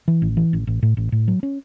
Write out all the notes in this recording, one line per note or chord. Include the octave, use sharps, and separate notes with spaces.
E3
A1
E3
A1
A1
A2
A1
A2
F#3
C#4